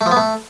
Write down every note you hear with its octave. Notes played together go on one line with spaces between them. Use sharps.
A3
F3
B3
A3